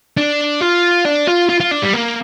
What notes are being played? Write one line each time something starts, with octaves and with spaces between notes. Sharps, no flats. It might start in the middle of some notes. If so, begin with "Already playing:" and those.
D4
F4
D4
F4
F4
F4
D4
G3
A#3